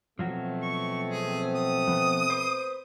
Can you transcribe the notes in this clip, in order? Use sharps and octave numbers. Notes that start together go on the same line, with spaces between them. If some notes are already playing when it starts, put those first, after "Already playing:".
B2 F3 F#3 A3 C4 F#4
C#6
G#4
D#6
F3 B3
B4 C5